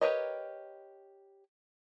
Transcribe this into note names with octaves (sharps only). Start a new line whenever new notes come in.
G4 A#4 B4 C#5 D#5